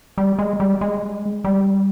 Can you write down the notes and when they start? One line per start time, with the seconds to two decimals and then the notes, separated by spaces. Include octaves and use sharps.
0.18 G3
0.39 G#3
0.60 G3
0.81 G#3
1.44 G3